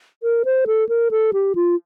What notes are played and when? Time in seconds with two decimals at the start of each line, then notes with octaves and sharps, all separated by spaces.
0.23 A#4
0.45 C5
0.67 A4
0.89 A#4
1.11 A4
1.33 G4
1.55 F4